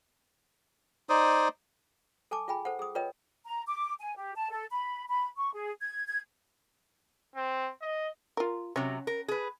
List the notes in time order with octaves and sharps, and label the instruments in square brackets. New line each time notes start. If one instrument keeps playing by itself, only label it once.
[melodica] D#4 C5 D5 D#6
[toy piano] A4 G#5 A5 D6
F4 G#4 G5 G#5 B5
A4 C5 F#5
G#4 D#6
F4 A#4 B4 C#5 D#5 G5
[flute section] A#5
D6
G#5
G4
A5
A4
B5
B5
C#6
G#4
G#6
G#6
[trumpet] C4
D#5
[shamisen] F4 A#4
[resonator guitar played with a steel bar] C3 F#3 [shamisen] C#4
[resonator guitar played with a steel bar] A#4
G#4 B4